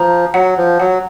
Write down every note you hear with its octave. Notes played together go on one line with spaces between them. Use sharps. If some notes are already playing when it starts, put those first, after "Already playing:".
Already playing: F3 A#5
F#3 F#5
F3
F#3 F#5